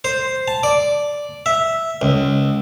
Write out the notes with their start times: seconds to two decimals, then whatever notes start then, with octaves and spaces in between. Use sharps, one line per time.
0.04 C5
0.48 A5
0.63 D5
1.46 E5
2.02 C#2